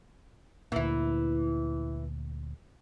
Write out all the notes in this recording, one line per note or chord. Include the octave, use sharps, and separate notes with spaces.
D2 A#2 E3 E4